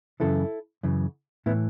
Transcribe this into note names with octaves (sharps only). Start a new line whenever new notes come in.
F#2 C#3 E3 E4 A4
F#2 C#3 E3
A2 E3 B3 E4